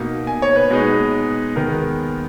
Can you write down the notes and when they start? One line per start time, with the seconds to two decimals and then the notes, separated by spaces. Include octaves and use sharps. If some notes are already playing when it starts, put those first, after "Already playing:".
Already playing: B2 A#3 D#4
0.27 G#5
0.42 C#5
0.56 B4
0.70 B2 G#3 B3 D#4
1.56 D#2 D#3 G#3 B3 A#4